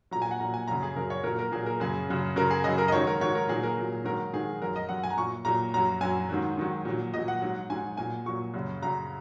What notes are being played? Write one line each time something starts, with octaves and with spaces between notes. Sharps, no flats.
A#2 F#3 A#5
G#5
F#5
A#2 F#3 A#5
G#5
F#2 C#3 F#3 A#5
G#4
F#2 C#3 F#3 A#4
C#5
A#2 F#3 A#4
A#4
A#2 F#3 G#4
A#4
F#2 C#3 F#3 G#4
F#2 C#3 F#3
F#2 C#3 F#3 A#4
G#4
F#2 C#3 F#3 D#5
A#4
D#5
G#2 D#3 F#3 C#5
A#4
G#2 D#3 F#3 C#5
A#4
A#2 F#3 G#4
A#4
A#2 F#3
G#2 D#3 F#3 A#4
G#2 D#3 F#3 G#4
F#2 F#3 A#4
D#5
F#2 F#3 F#5
G#5
A#5
A#2 F#3 C#6
A#2 F#3 A#5
F#2 F#3 A#5
F#2 F#3 G#5
G#2 D#3 F#3
G#2 D#3 F#3
A#2 F#3
A#2 F#3 D#5
F#5
G#2 F#3
G#2 F#3 G#5
A#2 F#3 G#5
A#2 F#3 C#6
F#2 C#3 F#3
F#2 C#3 F#3 A#5